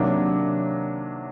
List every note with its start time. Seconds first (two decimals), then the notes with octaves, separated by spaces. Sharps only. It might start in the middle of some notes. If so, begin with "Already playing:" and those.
Already playing: C3 D#3 F#3 A#3 D4